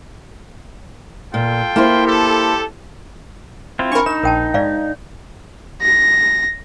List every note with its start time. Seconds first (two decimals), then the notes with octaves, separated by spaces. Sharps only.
1.34 A#2 F4 A4 G5
1.76 A#3 E4 C5
2.06 G4 A4
3.79 C4 E4 F4
3.92 D4 A#4 B5 C#6
4.06 D#4 A#4 E7
4.24 A#1 A#4 G5 A5
4.54 G#2 D5 F5
5.82 A#6